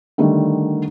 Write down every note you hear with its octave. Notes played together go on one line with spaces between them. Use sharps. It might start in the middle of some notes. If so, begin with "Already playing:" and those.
D3 D#3 G3 A3